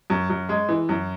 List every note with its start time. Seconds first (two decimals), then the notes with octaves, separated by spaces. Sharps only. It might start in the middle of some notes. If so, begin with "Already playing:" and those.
0.10 F#2
0.30 F#2
0.49 G#3
0.69 E3
0.89 F#2